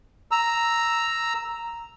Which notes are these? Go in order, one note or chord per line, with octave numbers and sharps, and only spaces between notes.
A#5 E6